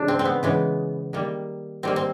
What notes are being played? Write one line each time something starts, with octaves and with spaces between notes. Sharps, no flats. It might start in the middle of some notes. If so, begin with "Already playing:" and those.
Already playing: C#3 E3 G#3 D4
C4
C4
B3
C#3 E3 G#3 B3
D#3 G3 A#3
D#3 G3 A#3 C4
C4